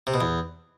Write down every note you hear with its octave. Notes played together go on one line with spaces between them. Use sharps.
C3
B2
E2